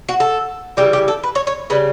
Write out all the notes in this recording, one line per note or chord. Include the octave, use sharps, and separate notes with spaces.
F#4
A4
C#3 E3 G3 G4
G4
A4
B4
C#5
C#5
C#3 G3 B4